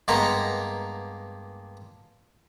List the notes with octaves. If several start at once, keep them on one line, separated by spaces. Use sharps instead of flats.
G2 G#3 A#3 B3 A#5